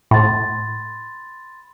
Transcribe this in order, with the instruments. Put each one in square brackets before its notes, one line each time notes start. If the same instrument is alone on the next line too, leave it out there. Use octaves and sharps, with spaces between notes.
[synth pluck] A2 [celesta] B5 C6 A6